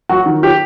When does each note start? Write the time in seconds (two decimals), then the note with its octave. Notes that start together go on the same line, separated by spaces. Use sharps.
0.09 F#3 F#4
0.26 D#3
0.43 G4